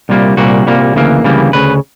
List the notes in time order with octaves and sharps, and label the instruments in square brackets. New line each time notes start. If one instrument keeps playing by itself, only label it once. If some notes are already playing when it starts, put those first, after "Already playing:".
[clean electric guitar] C2 A#2 G3 A#3
C2 A#2 G3 A#3 F#4
C2 A#2 G3 A#3
D2 C#3 E3 G3 A#3
D2 C#3 E3 G3 A#3
D2 C#3 B4